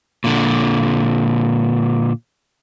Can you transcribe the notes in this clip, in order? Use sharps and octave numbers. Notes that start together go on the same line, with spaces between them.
A#2 D3